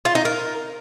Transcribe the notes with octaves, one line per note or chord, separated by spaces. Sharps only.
F4
D#4
A#4